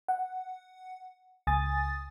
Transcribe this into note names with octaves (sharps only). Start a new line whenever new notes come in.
F#5
C#2 G#5 D#6 A6